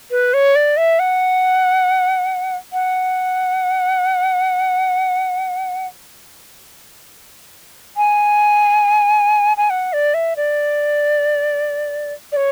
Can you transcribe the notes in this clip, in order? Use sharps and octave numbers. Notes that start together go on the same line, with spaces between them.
B4
C#5
D5
E5
F#5
F#5
G#5
G#5
F#5
D5
E5
D5
D5
C#5